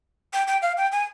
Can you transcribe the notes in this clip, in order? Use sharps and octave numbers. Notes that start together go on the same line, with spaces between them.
G5
G5
F5
G5
G#5